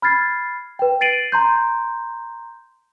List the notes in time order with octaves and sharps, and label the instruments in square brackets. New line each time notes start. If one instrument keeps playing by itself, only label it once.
[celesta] B5 F6 G#6 A6 C7
B4 G5
A6 C7 D7 D#7 F#7
A#5 C6 G6